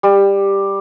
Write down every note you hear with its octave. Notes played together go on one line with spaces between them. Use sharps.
G3